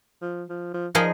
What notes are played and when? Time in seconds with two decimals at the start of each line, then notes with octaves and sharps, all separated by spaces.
0.22 F3
0.49 F3
0.74 F3
0.95 F3 D#4 G#4 A#4